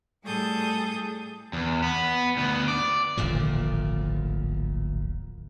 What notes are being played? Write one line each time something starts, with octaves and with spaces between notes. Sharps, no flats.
A2 G3 G#4 A4 D#6 G6
E2
B3
D2 B3
D5
D1 G#1 A#2 F3